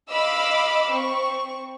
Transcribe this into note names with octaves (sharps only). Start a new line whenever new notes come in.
D#5 F5 B5 D6 E6
C4 C#6